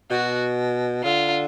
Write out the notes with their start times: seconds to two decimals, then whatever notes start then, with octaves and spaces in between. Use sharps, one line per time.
0.11 B2 F#4
1.04 D3 F4